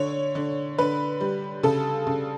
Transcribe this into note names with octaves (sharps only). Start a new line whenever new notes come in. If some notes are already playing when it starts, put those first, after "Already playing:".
Already playing: D3 C#5
D3
D3 B4
G3
C#3 A4
C#3